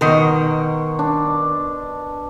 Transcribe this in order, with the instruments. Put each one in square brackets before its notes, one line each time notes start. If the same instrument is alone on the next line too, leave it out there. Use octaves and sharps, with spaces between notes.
[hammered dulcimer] B2 C6 [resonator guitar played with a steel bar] D#3 A#4
[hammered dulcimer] D4